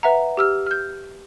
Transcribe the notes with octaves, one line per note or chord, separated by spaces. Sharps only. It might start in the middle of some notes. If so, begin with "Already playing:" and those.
B4 E5 F#5 A#5
G4 E6 F6
F6 G6